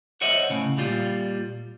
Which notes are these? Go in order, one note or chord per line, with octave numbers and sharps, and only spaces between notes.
C5 C#5 D#5 E5 F#5
A2 C#3
A#2 G3 F4